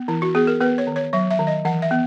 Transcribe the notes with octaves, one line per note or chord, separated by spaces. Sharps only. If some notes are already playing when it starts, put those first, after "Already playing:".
Already playing: B3
E3 E4
F#4
B3 G#4
A#4
B3 B4
C#5
D#3
C#5
F#3 E5
E5
D#3
D#5
E3 F#5
E5
B3